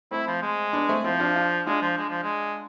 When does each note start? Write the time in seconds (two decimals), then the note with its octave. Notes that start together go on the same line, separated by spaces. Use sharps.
0.11 A3 C4 E4
0.27 F3
0.42 G#3
0.73 B3 D4
0.89 A3 C4
1.04 F3 C4 E4
1.20 D4 F4
1.36 D4 F4
1.66 G#3 D4 F4
1.82 F3
1.98 G#3
2.10 F3
2.23 G#3